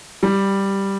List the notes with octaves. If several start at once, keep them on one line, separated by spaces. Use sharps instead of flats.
G3